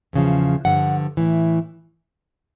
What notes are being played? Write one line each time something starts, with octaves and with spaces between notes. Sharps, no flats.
E2 C#3 F3
G2 D3 F3 F#5
A2 E3